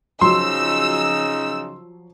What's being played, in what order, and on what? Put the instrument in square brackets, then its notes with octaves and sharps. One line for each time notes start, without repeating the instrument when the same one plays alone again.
[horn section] C#3 D#4 [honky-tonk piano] F3 F#3 [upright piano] C6 [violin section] E6